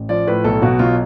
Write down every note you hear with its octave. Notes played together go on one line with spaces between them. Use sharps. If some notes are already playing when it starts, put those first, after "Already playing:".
Already playing: A1
F3 D5
A2 B4
B1 A4
B2 F#4
B1 F4